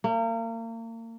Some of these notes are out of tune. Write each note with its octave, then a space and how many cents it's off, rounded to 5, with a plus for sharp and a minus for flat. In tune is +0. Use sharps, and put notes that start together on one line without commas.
A#3 -35